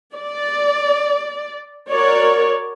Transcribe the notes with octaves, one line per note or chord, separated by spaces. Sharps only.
D5
F#4 A#4 C#5 D5